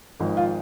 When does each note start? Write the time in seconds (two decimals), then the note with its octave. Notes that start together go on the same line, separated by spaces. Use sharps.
0.20 G#1 G#2 F3
0.37 F4